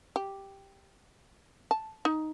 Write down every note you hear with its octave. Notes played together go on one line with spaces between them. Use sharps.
G4
A5
D#4